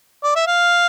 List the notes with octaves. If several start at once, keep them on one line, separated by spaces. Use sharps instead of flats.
D5
E5
F5